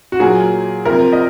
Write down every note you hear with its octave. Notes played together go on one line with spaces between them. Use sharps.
F#4
A#2 F#3 A#3 G#4
C3 F3 C4 A#4
D#5